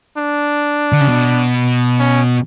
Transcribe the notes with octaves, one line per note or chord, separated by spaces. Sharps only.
D4
D3
C#3
B2
C#4